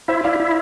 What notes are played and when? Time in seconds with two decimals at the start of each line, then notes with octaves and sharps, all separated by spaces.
0.08 E4 C5 E5
0.24 E4 D5 F5
0.40 E4